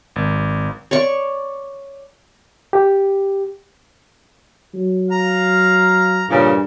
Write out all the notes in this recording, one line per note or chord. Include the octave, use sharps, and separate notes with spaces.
G#1
C#5 D5 C#6
G4
F#3
F5 A#5
E2 G2 A#2 C#3